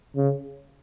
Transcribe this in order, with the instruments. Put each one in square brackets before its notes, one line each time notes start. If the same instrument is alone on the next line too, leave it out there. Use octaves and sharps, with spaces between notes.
[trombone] C#3